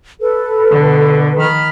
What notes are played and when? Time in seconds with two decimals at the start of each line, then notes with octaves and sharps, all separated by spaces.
0.21 A4 B4
0.70 B2 D3
1.39 D#3 B5 F6